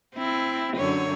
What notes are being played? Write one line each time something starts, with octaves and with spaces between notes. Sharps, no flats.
C4 E4
F#2 D3 C#5